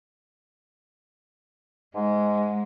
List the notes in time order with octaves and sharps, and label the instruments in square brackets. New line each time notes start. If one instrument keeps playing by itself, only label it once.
[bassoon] G#2 [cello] G#3